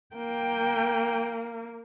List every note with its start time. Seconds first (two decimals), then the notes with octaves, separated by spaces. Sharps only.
0.16 A#3 G5